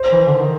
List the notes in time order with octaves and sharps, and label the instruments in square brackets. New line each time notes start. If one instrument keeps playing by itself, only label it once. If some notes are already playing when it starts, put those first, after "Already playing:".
Already playing: [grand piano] C5
[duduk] E3
D3
D#3